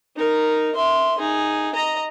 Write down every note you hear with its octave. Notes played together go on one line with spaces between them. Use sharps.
D#4 A#4
E5 C6
D#4 G#4
D#5 A#5